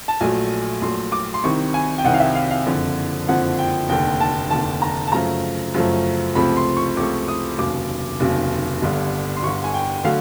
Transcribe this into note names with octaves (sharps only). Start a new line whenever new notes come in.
A5
A#1 A#2 F#3 A3 G#5
A#1 A#2 F#3 A3 C6
D6
C6
C2 C3 D#3 C#6
G#5
G5
C2 C3 D#3 F#5
F5
E5
F5
F5
F#1 F2 D3 F3
F#1 F2 D3 F3 F#5
G5
F1 D#2 D3 G5
A5
F1 D#2 D3 A5
A#5
A5
F#2 C#3 F3 A3 A#5
F#2 C#3 F3 A3
C#2 C3 F3 A3 B5
C6
C#6
C#2 C3 F3 A3 D6
D#6
F1 D#2 C#3 F#3 D6
F1 D#2 C#3 F#3
G1 G2 D3
C6
G1 G2 D3 C#6
G#5
G5
D3 F#3 A3 F5